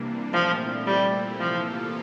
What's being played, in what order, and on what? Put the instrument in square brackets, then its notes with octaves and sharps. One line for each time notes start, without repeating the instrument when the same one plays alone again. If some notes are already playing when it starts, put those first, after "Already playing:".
Already playing: [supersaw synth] C3 E3 G3 A#3 D4
[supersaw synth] A#2 A3 C4 E4 [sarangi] F3
[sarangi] G3
[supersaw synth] C3 E3 A#3 F4 A4 [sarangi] F3